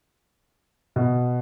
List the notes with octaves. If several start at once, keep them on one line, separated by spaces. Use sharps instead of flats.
B2